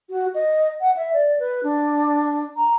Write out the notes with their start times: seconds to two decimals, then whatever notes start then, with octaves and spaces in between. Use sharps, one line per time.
0.10 F#4
0.35 D#5
0.81 F#5
0.96 E5
1.13 D5
1.39 B4
1.63 D4
2.56 A#5